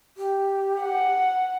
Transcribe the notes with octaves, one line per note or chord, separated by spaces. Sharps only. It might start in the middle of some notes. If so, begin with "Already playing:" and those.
G4
F#5